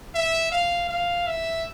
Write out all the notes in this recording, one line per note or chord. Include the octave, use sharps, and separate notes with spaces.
E5
F5
F5
E5